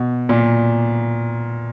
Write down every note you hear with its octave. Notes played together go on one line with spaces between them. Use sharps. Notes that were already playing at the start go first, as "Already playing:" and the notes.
Already playing: B2
A#2